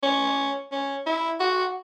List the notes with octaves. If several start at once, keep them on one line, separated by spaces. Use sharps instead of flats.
C#4
C#4
E4
F#4